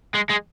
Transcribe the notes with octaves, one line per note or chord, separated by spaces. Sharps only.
G#3
G#3